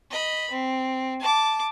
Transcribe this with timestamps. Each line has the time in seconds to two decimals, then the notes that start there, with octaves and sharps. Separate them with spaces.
0.11 D#5 B5
0.51 C4
1.20 A5 D6